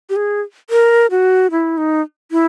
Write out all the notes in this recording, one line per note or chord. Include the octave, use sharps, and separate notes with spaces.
G4
G#4
A#4
F#4
E4
D#4
E4